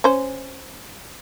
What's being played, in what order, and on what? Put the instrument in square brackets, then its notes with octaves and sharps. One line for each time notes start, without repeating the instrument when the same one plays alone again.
[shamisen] C#4 C5